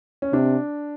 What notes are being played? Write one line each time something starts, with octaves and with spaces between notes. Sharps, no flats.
C#4
C3 D4